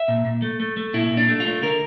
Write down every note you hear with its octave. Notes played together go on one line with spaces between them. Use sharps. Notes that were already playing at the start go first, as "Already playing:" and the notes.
Already playing: E5
A#2
A#2
A3
A3
A3
A#2 E4
A#2
D4
A3
F4
A3
D3 A#4